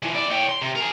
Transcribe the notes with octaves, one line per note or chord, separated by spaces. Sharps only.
E3 F3
E4 D5
C#5 G5
C6
C3
G#4 A#4